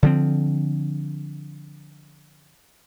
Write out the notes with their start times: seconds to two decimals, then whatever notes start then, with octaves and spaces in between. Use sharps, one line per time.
0.03 D3 F3 C4